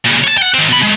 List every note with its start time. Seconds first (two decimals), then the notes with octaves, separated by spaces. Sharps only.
0.05 A#2 C#3
0.24 C#5 A5
0.38 F#5 G5
0.54 D#3 C4
0.69 B2 B5
0.83 G#3 A3